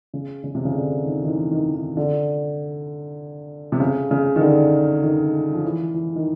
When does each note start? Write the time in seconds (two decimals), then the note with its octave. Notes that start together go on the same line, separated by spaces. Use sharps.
0.14 C#3
0.44 C#3
0.55 C3
0.65 C#3
0.75 D3
1.05 D#3
1.24 D#3
1.28 E3
1.51 D#3
1.74 D#3
1.97 D3
3.72 C3
3.80 C#3
4.11 C#3
4.36 D#3
4.41 D3
5.03 D#3
5.53 F3
5.64 E3
5.94 E3
6.16 D#3